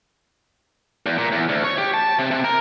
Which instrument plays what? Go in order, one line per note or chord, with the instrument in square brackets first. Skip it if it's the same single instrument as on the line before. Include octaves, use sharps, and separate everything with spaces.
[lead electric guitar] E2
A#2
E2
D2
C#5
G4
A5
C3
C3
A#4